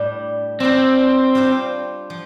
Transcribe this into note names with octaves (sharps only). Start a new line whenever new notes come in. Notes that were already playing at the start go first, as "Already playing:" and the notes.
Already playing: A2 G3 D4
G3 C4 D4 F4 C5
G3 D4 F4 C5
F3